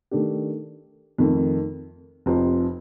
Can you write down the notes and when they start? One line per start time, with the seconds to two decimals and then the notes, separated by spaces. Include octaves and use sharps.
0.11 D#3 A3 D4 G4
1.18 F2 D#3 A3
2.26 F1 F2 C3 F3 C4